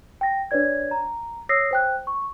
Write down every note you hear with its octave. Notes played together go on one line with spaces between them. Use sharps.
G5 A#6
D4 B4 C#5 D5 G#6
A#5
C#5 D#6 E6 A#6 C7
C5 G5 F#6
C#6